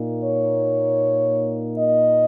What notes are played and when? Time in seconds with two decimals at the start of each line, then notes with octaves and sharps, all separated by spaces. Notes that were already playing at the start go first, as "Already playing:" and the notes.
Already playing: A#2 A#3 D#4
0.24 C#5
1.78 D#5